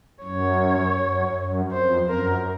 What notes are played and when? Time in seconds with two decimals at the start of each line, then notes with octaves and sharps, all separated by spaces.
0.23 F#2 C#5
0.97 F#2
1.35 F#2
1.72 F2 C5
2.09 F#2 A#4